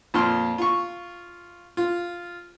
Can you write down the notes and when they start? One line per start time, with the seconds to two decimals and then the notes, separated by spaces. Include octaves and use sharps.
0.14 F2 A#2 C6 F6
0.58 F4 C#6
1.77 F4